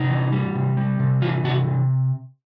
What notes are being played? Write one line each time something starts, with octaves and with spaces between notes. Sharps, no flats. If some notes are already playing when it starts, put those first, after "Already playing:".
Already playing: C3 D#4
E3
G3
C3
G3
C3
E3 F4
C3 F#4
C3